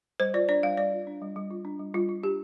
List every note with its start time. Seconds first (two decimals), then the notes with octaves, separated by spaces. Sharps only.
0.20 G3 C5
0.34 F4 D5
0.49 D4 D5
0.63 G3 F5
0.77 G3 D5
0.92 F4
1.07 D4
1.22 G3
1.36 G3
1.51 F4
1.65 D4
1.79 G3
1.94 G3 F4
2.09 F4
2.23 D4 G4